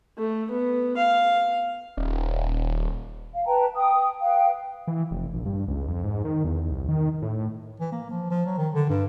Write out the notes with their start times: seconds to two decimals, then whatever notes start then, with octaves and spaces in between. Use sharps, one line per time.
0.18 A3
0.51 B3
0.97 F5
1.97 D#1
3.34 F5
3.46 B4 G5 A5 A#5
3.75 G5 D#6
4.19 B4 F5 G5
4.87 E3
5.11 F1
5.34 A#1
5.46 G2
5.68 C#2
5.88 F2
6.03 G#2
6.25 D#3
6.44 E2
6.71 C2
6.89 D#3
7.22 A2
7.80 E3
7.92 A#3
8.10 F3
8.31 F3
8.46 F#3
8.58 D#3
8.74 D3
8.90 G2